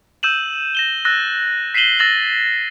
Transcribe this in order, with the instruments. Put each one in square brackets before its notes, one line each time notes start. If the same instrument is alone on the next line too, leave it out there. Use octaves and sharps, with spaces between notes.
[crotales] E6 G6 D#7 E7 F#7
A#6 E7 G7
E6 F#6 A6 A#6
B6 C7 D#7 E7 F#7 G7
E6 A6 A#6 E7 F#7 G7